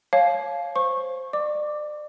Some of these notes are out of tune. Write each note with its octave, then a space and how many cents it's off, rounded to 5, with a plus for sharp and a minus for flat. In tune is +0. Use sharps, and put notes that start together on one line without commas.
C#5 -10 F5 +0 A5 -45
C5 +0 C#6 -20
D5 +35 D6 +0